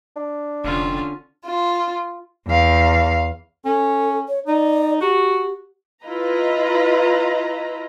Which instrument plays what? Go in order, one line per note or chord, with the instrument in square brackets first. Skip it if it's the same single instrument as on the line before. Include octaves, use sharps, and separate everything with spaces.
[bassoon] D4
[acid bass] F1 [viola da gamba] D3 C#4 [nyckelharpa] F4
[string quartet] F4
[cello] E2 F5
[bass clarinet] C#4 [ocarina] A4
[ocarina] C#5
[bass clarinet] D#4 [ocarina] D5
[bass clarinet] F#4 [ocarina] G4
[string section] E4 F4 B4 D#5 A#5